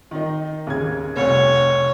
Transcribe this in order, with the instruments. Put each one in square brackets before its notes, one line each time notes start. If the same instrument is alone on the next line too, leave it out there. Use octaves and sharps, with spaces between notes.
[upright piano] D#3 D#4
D#2 C#3 G#6
[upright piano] F1 C2 [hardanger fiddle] C#5